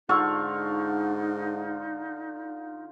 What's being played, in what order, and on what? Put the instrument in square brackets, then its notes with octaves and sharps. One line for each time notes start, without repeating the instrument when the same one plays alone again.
[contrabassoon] G#2 [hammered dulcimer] D3 F4 C#6 [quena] D#4 [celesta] F#5 E6